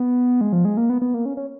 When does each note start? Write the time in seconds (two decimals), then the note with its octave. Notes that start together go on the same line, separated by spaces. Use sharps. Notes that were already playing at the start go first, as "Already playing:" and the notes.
Already playing: B3
0.41 G#3
0.53 F3
0.65 G#3
0.77 A#3
0.90 B3
1.02 B3
1.14 A#3
1.25 C#4
1.37 C#4